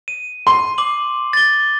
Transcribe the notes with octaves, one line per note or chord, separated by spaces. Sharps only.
D#7
C6
D6 F#7
A6 G7